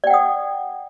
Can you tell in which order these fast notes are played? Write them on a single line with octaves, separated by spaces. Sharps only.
D5 G5 F#5 D#6